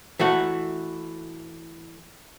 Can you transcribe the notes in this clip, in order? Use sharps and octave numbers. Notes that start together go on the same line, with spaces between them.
E3 A3 F#4